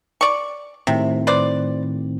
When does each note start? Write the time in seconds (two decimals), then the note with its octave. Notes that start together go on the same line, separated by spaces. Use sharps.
0.21 D5 C#6
0.87 A2 C3 D#3 C4
1.27 B4 C5 D5